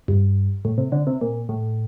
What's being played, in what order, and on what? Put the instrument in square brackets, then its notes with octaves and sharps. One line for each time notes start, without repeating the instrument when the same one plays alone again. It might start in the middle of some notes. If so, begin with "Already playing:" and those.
[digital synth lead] G2
A2
C3
D3
C3
A#2
A2